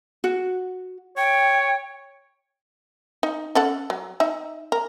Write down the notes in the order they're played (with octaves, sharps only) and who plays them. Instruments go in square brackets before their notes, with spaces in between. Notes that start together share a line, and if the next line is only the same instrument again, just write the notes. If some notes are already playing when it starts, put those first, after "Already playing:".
[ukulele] F#4
[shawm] C#5 [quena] G5
[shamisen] D#4
C#4 A4 F#5
F#3
D#4 E5
A#4